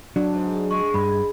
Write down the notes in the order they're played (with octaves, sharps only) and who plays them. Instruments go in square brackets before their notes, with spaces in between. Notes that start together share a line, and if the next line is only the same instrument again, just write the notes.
[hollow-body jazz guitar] F#3 [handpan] D4
[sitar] G#2
[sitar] G#3 [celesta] C#6
[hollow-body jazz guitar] G2 [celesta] B5